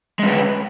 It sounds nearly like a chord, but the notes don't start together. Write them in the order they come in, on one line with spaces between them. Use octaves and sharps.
G#3 C#4 B4